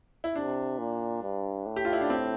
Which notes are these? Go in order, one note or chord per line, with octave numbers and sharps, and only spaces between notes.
E4
C3 D4
A#2
G2
A2
G4
F4
E4
D4
C4